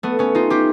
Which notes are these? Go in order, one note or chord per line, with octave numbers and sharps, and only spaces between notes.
A3 B3
B3 C#4
D#4 F4
F4 G4